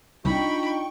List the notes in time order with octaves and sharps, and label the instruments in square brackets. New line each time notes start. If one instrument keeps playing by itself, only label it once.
[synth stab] C2 [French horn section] D4 D#4 F4 [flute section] G5 C#6 [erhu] B5